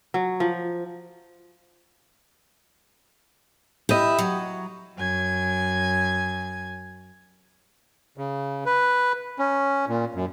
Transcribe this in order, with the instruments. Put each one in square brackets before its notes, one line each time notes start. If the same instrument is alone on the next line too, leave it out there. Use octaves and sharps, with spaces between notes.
[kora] F#3
F3
[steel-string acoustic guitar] E4 [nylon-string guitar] G4 D#5
[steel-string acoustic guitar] F#3
[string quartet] F#2 G#5 G#6
[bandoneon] C#3
B4
C#4
A#2
F#2